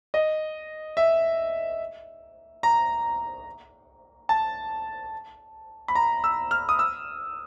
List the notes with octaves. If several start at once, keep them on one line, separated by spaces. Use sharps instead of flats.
D#5
E5
A#5
A5
B5
A#5
E6
F6
D#6
E6